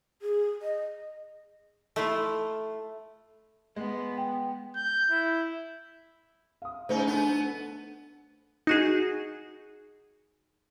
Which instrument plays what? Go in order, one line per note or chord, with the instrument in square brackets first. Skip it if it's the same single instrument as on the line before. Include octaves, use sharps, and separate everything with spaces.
[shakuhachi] G#4
D#5
[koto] A3 E4 F4
[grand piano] G#3 [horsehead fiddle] B3
[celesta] G5
[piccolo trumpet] G6
E4
[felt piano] F5 D#6
[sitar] C#3 D#4 [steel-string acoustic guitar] A3 [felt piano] C5
[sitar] B3 [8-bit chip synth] D4
[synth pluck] D#4 F#4 G#4